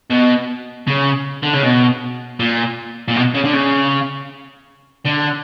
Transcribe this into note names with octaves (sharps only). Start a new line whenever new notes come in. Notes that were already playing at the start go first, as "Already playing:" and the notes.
B2
C#3
D3
C#3
B2
A#2
A#2
B2
C#3
D3
C#3
D3